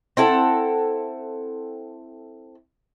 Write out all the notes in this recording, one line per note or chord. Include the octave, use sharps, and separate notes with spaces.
C4 E4 A4 F#5